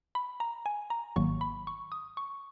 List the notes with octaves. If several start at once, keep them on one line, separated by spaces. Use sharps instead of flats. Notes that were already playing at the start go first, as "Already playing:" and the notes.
B5
A#5
G#5
A#5
G#1 G#2 D#3 F#3 A#3 C#6
B5
C#6
D#6
C#6